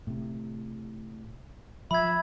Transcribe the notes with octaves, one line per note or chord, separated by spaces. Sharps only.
A2 C3
F3 E5 B5 G#6